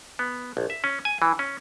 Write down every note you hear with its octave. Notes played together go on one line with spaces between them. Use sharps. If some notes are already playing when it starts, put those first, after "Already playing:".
B3
A#1
E5
C#4
G#5
E3
C#4